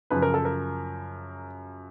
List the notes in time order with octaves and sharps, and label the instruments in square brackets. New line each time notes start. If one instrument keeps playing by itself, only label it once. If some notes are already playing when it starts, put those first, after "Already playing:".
[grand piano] F#2 C#3 F3 B4
A#4
A4
A#4